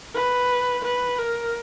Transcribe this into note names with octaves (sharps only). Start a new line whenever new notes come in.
B4
B4
A#4